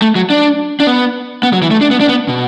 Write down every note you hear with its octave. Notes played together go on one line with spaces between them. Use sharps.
A3
F#3
D4
D4
B3
B3
F#3
E3
A3
D4
B3
D4
B3
B2